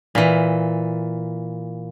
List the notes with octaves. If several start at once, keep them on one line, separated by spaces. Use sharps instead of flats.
A#2 E3